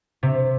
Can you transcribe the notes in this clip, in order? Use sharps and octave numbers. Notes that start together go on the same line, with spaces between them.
C3